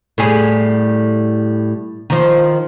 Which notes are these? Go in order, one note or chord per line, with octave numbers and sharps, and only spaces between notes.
A2 G3 G#4
D#3 F3